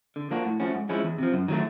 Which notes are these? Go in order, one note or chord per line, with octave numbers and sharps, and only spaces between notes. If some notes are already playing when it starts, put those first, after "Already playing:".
D3
F3 A#3 D4 F#4
A2
F3 A3 C#4 F#4
G#2
F3 G#3 C#4 E4
E2
C3 F3
F#2
D#3 F#3 A3